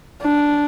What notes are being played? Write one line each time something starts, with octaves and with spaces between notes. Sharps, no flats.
D4